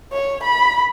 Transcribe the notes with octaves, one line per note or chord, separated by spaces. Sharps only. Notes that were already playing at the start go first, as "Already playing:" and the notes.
C#5
B5